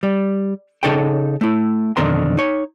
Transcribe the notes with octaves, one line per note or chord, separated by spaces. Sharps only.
G3
C#3 D#4 A4 C#5 G5
A3 E4
B1 F2 D3 D#3 A#4 C6
D#4 C#5